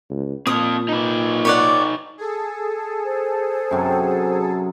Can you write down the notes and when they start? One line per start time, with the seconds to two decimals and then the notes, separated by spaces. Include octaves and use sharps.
0.10 C#2
0.47 A#2 C4 F4 D#6
0.88 D#4 B4
1.45 C#5 D5 F#5
2.18 G#4 A4
3.05 C5
3.71 F#2 C3 F#3